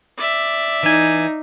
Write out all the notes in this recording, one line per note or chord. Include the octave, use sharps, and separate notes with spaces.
D5 E5
E3 D#4 G#5